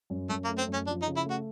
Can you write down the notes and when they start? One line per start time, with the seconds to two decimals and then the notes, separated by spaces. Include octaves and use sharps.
0.10 F#2
0.29 F#2 A3
0.44 A#3
0.49 A3
0.58 C4
0.68 F#2
0.73 C#4
0.87 F3 D4
1.02 D#4
1.07 C#3
1.16 E4
1.25 A3
1.31 F#4